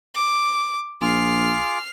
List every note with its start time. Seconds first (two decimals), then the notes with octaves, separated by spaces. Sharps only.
0.14 D6
1.01 A#1 F4 G#4 D6 F6 C7